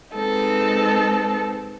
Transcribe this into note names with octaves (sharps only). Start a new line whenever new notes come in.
G#3 C4 D#4 A4 B4